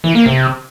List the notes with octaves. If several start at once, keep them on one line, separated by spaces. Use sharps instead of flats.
E3
A#3
C3